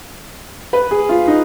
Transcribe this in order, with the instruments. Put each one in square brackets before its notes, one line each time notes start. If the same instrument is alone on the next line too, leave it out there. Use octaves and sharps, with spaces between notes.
[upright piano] B4
G#4
F4
D#4